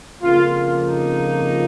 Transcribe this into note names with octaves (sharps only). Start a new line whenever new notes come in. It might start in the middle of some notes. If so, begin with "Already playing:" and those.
F2 C#3 F3 A#3 F4
F4
D#4